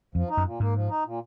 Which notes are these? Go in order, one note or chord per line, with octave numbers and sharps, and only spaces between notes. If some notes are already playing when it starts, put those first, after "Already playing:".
F2 F3
D#4
F#2
A#2
G#2 A#3
F3
D#4
A#2